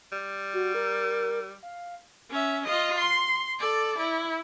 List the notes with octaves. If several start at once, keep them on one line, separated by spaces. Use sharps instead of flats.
G3
F#4
A#4
F5
C#4 E5
F4 D#5
C6
A4 D5
E4